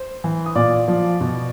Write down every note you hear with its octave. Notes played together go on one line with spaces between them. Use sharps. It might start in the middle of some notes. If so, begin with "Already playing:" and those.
Already playing: C5
E3
D#6
A#2 D5 D6
F3
B2